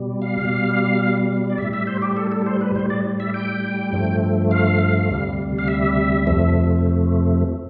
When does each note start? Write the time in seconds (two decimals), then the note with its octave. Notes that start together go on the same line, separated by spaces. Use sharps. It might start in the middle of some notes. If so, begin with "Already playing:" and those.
Already playing: B2 G3
0.22 F5
0.41 B2 G3
1.50 D5
1.58 A2 G3 E5
1.73 E5
1.87 C5
2.02 G4
2.17 A4
2.32 A4
2.46 C5
2.61 B4
2.75 A2 G3 C5
2.90 D5
3.20 E5
3.34 G5
3.93 G2 F3 A3
4.51 F5
5.10 D2 C3 G3
5.59 F5
5.68 E5
6.27 F2 C3 F3 A3